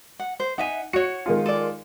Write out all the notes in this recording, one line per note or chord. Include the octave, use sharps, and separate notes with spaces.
F#5
C5
D#4 E5 F#5 G#5
F#4 C#5 C#7
D#3 G#3 F4
A4 D5